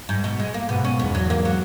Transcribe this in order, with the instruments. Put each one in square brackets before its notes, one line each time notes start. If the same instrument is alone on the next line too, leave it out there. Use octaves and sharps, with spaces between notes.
[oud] G#2
B2
G#3
A#3
[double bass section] G#2 B2 [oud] B3
[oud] C#4
[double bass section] E2 G#2 [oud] B3
[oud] F#3
A#3
F#3